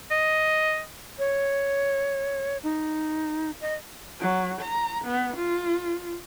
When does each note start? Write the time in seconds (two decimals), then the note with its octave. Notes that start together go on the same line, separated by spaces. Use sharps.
0.11 D#5
1.19 C#5
2.63 D#4
3.61 D#5
4.20 F#3
4.61 A#5
5.04 B3
5.36 F4